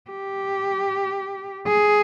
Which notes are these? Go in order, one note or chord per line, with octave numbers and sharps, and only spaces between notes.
G4
G#4